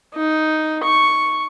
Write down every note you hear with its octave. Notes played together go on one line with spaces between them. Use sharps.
D#4
C#6